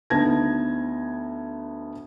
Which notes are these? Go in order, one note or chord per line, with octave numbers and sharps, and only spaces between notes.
D2 B3 D#4 A5 G#6 A#6